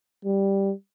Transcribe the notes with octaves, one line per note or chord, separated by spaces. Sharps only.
G3